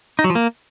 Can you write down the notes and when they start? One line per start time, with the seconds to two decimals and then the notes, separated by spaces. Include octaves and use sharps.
0.19 D#4
0.24 F#3
0.30 F3
0.35 A#3